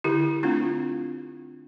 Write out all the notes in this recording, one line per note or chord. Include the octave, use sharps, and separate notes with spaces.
D3 E4 G4
A3 C4 D4 F4